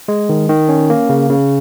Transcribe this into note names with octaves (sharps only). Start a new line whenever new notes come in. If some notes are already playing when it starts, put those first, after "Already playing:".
G#3
D#3
D#3
C#4
A#3
C#3
C#3